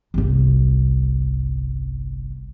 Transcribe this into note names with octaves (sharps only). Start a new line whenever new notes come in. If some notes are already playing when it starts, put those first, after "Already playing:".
G1 C2